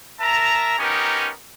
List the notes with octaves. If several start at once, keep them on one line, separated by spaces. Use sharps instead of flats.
A#4 E5 A5 A#5
B3 C#4 D#4 G4 A#4